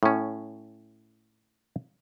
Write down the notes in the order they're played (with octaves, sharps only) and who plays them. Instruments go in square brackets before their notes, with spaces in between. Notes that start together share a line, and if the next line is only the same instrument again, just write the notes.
[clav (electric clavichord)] A2 C#4